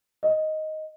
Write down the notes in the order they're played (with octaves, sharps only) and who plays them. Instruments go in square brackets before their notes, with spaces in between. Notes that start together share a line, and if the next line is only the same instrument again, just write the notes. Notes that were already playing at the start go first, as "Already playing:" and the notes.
[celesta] D#5